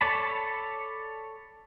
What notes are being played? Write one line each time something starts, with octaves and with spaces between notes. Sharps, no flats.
A4 C#5 D5 A5 B5